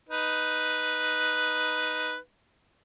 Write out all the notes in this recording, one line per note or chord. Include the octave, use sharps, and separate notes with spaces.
D#4 B4